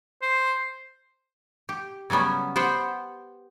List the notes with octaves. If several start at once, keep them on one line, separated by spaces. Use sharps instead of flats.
C5
G4
C#3 F#3 G3 B3 C#4
B3 G4 C5 F#5 G5